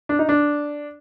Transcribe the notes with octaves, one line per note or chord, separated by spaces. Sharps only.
D4
D#4
D4